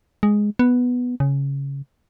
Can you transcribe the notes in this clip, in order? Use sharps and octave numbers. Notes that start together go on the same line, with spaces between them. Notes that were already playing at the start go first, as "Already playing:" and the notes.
G#3
B3
C#3